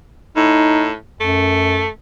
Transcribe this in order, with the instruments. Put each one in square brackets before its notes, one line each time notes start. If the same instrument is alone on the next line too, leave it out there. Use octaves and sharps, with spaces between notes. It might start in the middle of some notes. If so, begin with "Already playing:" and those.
[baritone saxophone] A2 [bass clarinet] D#4
[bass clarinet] F#2 [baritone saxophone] A3